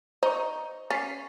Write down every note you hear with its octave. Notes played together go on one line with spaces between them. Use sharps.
D#4 C5 C#6
C#4 A6 B6 C7